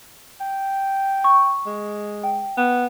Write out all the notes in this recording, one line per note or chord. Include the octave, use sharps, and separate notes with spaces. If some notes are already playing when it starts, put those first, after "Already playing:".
G5
C#6
G#3
G5
B3